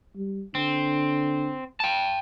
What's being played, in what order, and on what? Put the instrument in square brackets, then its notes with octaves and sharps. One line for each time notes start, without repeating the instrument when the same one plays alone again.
[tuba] G3
[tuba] D3 [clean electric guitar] C4
[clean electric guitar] G5 A5